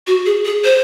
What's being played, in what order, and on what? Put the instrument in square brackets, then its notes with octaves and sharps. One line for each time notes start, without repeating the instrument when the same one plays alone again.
[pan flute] F#4
G#4
G#4
C5